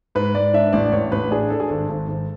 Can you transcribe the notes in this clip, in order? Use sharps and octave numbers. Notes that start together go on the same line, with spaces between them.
G#2 B4
G#2 D5
D4 E5
A1 D5
A1 C#5
A1 B4
D4 G#4
D4 A4
G#4
G#1 A4
G#1
G#1